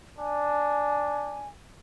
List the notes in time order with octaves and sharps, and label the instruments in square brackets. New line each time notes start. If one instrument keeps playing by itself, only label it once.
[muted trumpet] D4 [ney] G#5